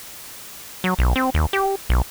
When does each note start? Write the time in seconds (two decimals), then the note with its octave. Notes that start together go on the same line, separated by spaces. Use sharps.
0.84 F#3
0.99 B1
1.16 C4
1.34 D#2
1.53 G4
1.89 B1